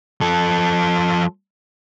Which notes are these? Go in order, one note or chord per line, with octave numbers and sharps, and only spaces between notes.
F3 A4